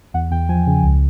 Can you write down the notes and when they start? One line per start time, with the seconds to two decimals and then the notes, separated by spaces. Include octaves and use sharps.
0.14 E2 F#5
0.31 E2 G5
0.49 F3 G#5
0.67 C#3
0.83 C#2